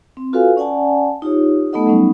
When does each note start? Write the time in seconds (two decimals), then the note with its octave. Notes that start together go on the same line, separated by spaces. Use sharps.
0.17 C4
0.33 F4 F#4 A4 B4 F5 G#5
0.57 C#4 D5 F#5 G#5 A5
1.22 D#4 F4 G4 C#5
1.73 A3 B3 D#4 A4 D#5 F#5
1.86 F#3 G3 B3 C#4 D#4